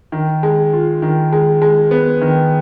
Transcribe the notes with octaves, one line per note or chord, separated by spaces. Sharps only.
D#3
G#3
F4
D#3
G#3
G#3
B3
D#3